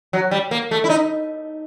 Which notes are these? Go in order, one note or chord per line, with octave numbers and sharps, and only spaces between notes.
F#3
G3
A#3
A3
E4
D#4